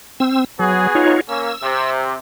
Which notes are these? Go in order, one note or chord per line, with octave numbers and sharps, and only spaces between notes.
C4 E6
F#3 B3 F#4 G#4
D#4 F4 C#5
A#3 C#4 E6
C3